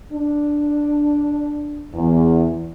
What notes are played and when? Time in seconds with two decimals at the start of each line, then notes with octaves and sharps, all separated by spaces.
0.12 D4
1.93 E2